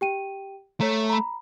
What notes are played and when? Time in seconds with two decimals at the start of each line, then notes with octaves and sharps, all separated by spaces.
0.01 G4 G5 D#7
0.80 A3 C#5 A#5
1.10 A#5 B5